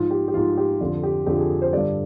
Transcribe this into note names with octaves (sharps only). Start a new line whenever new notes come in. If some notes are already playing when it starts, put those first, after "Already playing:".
Already playing: G#2 F3 F4
G4
G4
G#2 F3 F4
G4
F2 D3 F3 F4
G4
F2 D3 F3 G4
G#4
C5
G2 D3 G3 D5